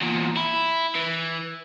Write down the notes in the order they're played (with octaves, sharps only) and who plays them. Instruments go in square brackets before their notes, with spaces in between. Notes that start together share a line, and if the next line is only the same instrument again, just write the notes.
[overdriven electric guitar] E2 A#2
E4
E3